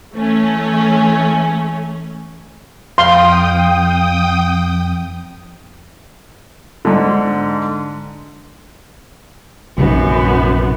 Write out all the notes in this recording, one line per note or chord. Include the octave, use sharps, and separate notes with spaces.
E3 A3 C#4
F2 F5 G5 C6 D#6
G#2 D3
A#1 F#2 C3 D#3 B3